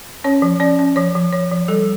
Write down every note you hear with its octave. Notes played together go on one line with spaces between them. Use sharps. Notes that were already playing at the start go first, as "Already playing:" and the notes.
C#4 C#5
F3
C#4 D5
C#4
F3 C#5
F3
F3 C#5
F3
G3 A4